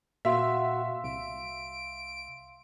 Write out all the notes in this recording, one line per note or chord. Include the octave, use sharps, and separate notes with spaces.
A#2 F#4 E5 F5 C6
C2 D7